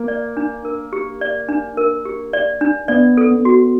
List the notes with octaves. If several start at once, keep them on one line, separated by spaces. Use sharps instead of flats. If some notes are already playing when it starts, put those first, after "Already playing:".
Already playing: A#3
D5
D4
A#4
G4
D5
D4
A#4
G4
D5
D4
B3 D5
A4
B3
F#4